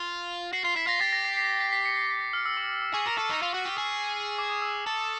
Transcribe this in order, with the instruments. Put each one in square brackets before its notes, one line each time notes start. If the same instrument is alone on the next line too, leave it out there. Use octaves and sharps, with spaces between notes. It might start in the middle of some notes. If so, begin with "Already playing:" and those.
Already playing: [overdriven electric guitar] F4
[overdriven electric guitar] F#4 [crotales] C7
[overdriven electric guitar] F4 [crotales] C7
[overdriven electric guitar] E4 [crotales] B6
[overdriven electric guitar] F4 [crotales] A#6
[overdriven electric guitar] G4 [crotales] A6
[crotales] A#6
C7
C7
B6
B6
C#7
C7
B6
A#6
F6
E6
D6
D6
[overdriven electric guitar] G#4 [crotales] C#6
[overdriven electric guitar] A#4 [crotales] D6
[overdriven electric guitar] A4 [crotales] C#6
[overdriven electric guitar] D#4 [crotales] C#6
[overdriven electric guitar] F4
F#4
G4
G#4
[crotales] D6
D#6
E6
D6
[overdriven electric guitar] A4